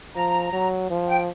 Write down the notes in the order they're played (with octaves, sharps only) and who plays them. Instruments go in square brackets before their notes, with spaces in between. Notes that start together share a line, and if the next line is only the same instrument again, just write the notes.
[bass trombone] F3 [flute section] A#5
[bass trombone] F#3
F3
[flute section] G5